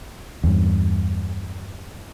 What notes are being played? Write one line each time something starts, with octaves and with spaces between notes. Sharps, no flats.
E2 G2